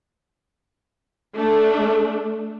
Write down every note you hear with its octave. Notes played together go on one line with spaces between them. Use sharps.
A3 D4